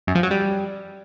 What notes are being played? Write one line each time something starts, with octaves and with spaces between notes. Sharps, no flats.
F#2
F3
F#3
G3